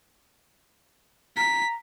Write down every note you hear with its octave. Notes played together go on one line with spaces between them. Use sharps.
A#5 B6